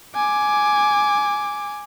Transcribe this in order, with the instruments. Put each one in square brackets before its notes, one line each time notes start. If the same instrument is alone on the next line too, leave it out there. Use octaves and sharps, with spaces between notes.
[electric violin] G#5 D6